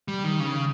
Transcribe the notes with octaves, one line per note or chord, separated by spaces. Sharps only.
G3
D#3
C#3